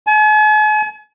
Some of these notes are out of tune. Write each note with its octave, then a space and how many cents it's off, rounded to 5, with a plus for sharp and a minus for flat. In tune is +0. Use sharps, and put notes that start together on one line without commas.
G#5 +45